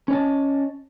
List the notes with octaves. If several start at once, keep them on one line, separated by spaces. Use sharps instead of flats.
C#4 C#5 D#5 A5